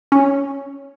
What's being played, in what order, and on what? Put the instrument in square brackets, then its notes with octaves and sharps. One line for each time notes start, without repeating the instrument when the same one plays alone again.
[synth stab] C#4